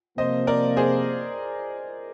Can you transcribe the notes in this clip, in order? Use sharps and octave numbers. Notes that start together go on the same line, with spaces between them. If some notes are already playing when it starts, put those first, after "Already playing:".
C3 F3 A#3 C5 D#5
A#4 D5
G#4 C5